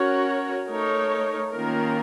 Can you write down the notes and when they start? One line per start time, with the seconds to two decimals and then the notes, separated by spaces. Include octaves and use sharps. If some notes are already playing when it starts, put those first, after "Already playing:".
Already playing: C#4 F#4 A#4 C#5
0.68 A3 D#4 A#4 C#5
1.52 D#3 A#3 C#4 F4 A#4